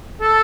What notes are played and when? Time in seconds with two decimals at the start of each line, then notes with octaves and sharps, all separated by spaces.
0.21 A4